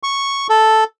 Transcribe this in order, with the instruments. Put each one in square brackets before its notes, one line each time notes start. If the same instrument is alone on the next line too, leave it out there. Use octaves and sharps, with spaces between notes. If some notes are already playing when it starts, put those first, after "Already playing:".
[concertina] C#6
A4